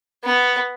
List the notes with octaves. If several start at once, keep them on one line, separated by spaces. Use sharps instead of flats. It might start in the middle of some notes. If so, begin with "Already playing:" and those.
B3